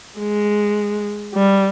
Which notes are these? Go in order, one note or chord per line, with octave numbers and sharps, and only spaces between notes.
G#3
G3